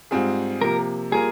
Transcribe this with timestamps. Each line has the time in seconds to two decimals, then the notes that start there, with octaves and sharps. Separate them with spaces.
0.11 G#2 G3 C4 F4 G#4
0.62 C3 F3 A#3 A#4
1.12 G3 A#3 F4 G#4 A#4